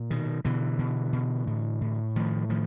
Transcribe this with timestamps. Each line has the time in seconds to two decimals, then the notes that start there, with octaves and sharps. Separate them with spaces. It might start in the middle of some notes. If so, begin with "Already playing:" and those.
Already playing: A#2
0.10 B2 D#3
0.45 B2 D3 E3
0.79 B2
1.13 B2
1.47 A2
1.81 A2
2.16 A2 D#3 F3
2.49 A2 D#3 F3